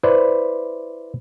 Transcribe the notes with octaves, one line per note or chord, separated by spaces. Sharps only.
E4 B4 C5 D5